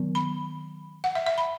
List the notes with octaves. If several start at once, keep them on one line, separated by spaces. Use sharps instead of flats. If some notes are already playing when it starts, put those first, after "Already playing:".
Already playing: D#3 F#3 B3
B5
F#5
E5
E5
B5